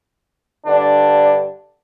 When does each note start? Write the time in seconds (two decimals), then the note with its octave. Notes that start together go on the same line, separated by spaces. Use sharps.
0.66 G2 D3 D4